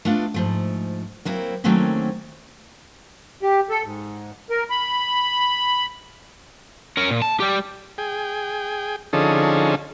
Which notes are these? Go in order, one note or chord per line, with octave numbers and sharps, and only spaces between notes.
A3 B3 D4 F4
G#2 F3 A3
F#3 A#3 C4 E4
D#3 F#3 A3 A#3 C4 C#4
G4
A4
G#2
A#4
B5
C#4 A#4
A#2
A5
G3 G4
G#4 G5
D3 F3 C#4 D#4 G#4 A4